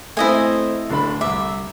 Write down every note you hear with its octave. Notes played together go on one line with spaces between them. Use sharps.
A3 C4 E4 D#5 G#5
D1 D3 B5
C2 E5 D6